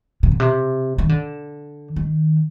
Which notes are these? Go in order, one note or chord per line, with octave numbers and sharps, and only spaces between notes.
C3
B2
C3
D#3
D3
D#3